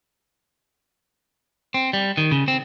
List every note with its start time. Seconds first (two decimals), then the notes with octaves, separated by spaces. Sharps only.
1.74 C4
1.93 G3
2.17 D#3
2.31 C#3
2.48 C4